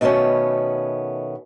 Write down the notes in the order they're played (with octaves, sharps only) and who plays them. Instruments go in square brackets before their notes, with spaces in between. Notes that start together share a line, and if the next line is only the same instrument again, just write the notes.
[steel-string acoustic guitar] B2 D#3 A3 B3 C#4